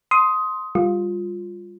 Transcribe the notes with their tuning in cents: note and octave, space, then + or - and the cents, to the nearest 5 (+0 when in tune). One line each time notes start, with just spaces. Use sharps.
C6 +0 D#6 +15
G3 +20 F4 +10